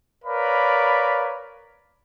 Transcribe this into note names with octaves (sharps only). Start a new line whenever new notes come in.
A#4 B4 C#5 D5 F5 B5